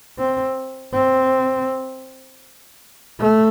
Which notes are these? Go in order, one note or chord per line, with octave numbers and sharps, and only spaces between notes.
C4
C4
A3